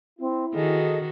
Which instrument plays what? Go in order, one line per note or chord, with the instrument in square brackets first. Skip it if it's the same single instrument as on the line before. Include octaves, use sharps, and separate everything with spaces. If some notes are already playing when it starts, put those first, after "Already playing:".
[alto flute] C4 [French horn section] E4
[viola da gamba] D#3 F#4 [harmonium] G#4 A4 [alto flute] D#5